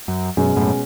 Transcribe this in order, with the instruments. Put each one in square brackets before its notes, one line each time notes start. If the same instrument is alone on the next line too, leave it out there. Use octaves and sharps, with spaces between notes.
[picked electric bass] F#2
[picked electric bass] F#2 [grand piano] B2 G#3 C#4
[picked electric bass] F#2 A2